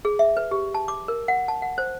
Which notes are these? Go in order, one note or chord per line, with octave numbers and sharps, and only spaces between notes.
G#4
E5
B4
G4
A5
D6
A#4
F#5
A5
F#5
C5